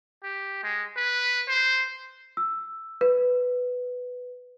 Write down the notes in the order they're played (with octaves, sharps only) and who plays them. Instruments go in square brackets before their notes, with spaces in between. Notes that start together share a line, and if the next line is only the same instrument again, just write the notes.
[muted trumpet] G4
G#3
B4
C5
[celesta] E6
B4